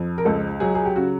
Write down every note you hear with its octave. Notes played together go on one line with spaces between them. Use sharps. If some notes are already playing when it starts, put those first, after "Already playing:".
Already playing: F2
A#4
C#2 A4
F#3 G#4
G#4
G4
C#3 F#4